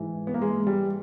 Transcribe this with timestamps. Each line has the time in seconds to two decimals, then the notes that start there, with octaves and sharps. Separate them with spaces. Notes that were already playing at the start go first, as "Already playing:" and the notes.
Already playing: G#2 E3
0.27 B3
0.34 A#3
0.42 G#3
0.67 G3